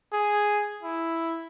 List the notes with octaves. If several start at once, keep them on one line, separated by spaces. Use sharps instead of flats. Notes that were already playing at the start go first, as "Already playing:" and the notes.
G#4
E4